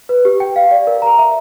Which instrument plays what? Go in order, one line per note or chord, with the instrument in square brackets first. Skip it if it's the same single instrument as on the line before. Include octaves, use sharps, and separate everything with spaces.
[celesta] B4
G4
G5
F5
D5
A#4
A#5
E5